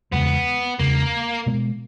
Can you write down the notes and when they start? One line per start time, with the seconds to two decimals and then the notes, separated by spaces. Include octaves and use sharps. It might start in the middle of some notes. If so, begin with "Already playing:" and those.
0.12 E2 C#3 G#3 B3
0.79 E2 C#3 G#3 A#3
1.46 B2 G#3 B3